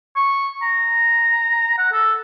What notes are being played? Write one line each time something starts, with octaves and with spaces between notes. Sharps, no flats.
C#6
A#5
F#5
A4